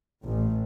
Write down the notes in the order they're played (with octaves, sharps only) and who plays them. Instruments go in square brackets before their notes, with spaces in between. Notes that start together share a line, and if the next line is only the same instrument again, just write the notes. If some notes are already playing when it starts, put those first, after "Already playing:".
[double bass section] A1